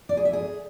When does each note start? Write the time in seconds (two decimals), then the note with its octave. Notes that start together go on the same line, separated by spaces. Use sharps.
0.09 D5
0.17 G#4
0.25 E5
0.33 G#4